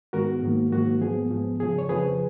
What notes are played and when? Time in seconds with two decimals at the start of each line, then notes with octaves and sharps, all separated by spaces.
0.13 G#2 D#3 G#3 B3 F#4 A#4
0.42 G#2 D#3 F#3 A#3
0.72 G#2 D#3 F#3 A#3 F#4
1.01 G#2 F3 B3 G#4
1.31 G#2 F3 B3
1.60 F2 C#3 F3 G#4
1.78 C#5
1.89 F2 C#3 F3 G#4 B4